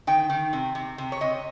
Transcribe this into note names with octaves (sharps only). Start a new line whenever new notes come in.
D#3 G5
D#3
C3
C3
C3
C#5
C3 D#5